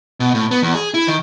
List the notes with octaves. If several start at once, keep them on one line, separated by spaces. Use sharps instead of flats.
B2
A2
B3
E2
G#4
E4
D#3